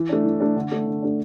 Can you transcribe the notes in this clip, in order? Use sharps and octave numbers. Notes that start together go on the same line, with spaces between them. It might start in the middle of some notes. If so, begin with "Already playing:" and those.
Already playing: E3
A3 D4
E3
A3 D4
D3
A3 D4
D3
A3 D4